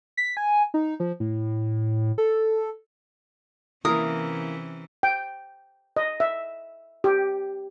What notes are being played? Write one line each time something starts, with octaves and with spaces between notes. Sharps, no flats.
B6
G#5
D#4
F3
A2
A4
C3 E3 A#3 C#4 E4 A#4 D#6
G5
D#5
E5
G4